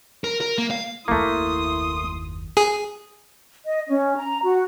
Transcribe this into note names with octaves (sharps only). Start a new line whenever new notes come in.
A#4
A#4
A#3
F5
F#1 D#2 A3 A#3 E4 C6 D#6
G#4
D#5
C#4
A#5
F#4